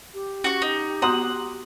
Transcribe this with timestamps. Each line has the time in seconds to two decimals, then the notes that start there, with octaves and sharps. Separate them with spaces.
0.14 G4
0.44 C#4 F#4 C#6
0.62 D#4
1.02 B3 F#4 F#5 A#5 C6 D#6